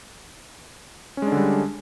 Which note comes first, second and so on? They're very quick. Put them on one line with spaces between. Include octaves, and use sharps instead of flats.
C#4 G#3 D4 D3 G3